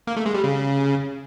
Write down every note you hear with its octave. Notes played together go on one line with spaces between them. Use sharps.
A#3
A3
G#3
G3
C#3